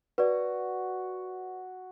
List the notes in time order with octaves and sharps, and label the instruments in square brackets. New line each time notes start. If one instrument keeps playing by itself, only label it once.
[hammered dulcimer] F#4 [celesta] B4 D5